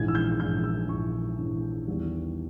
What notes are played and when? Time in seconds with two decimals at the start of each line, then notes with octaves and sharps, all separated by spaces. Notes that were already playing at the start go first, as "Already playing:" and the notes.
Already playing: A#1 G#2 E3 G#6
0.08 E6
0.15 G6
0.40 A#1 G#2 E3 G6
0.64 E6
0.89 A#1 G#2 E3 C#6
1.38 A#1 G#2 E3
1.87 E2 D#3 G3 B3 E4